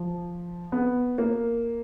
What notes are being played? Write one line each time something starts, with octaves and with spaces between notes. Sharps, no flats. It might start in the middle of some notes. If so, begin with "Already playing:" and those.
Already playing: F3
B3
A#3